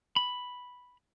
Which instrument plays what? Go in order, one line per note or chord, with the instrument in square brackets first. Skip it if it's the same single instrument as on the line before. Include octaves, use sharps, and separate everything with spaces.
[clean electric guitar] B5